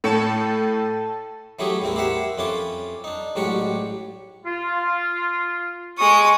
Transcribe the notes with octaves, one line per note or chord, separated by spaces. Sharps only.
A2 A4 C#5 A5 C#7
E3 F#3 A3 C#4 G4 G#4
A1 E2 C4 E4 A#4
E4 G4 A#4 C5 E5 F#5
F2 C#4 E4 F4 D6
D4 D#4
A1 G#2 F#3 D4 G4 C#6
F4
G#3 C#6 D#6